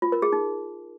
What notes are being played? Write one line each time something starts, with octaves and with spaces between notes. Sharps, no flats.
F4
A#4
G#4
D#4